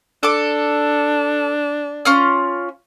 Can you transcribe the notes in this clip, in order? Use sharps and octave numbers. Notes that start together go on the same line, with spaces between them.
D4 A4 D6
C#4 F4 F6